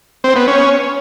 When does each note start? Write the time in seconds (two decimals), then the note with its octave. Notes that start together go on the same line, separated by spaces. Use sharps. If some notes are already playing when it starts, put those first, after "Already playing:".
0.24 C4
0.36 B3
0.48 C#4